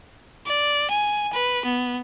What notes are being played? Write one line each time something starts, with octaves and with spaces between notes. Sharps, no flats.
D5
G#5
B4
B3